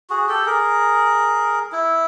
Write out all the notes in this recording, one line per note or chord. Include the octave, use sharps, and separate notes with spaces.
F#4 G#4
G4 A4
G#4 A#4
E4